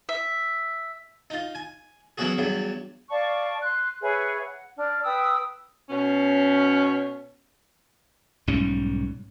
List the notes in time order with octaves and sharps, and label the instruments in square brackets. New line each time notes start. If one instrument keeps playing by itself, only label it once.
[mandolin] E5
[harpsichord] D#4 F4
G#5
E3 F#3 B3 C#4 F#4 G#4
E2 G2 F#3
[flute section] D5 F5 A5 C#6
C6 F#6
G#4 B4 C#5 E5
F#5
D4 D5 F6
B4 G5 D#6 E6
[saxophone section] B2 C#4
[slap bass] B1 G#2 G3 C#4